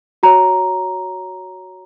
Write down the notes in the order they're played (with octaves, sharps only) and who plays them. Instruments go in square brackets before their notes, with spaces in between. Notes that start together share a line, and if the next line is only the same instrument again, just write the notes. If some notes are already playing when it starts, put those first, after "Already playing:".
[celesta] F#4 C#5 A#5